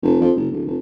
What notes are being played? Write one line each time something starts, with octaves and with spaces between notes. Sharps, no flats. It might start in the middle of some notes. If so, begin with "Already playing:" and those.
F1
F2
F#1
D1
F1